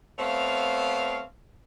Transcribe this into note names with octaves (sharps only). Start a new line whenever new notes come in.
A3 B3 C4 C#5 F5